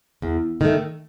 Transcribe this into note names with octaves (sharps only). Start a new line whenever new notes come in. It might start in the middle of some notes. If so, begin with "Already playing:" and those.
E2
D#3 A3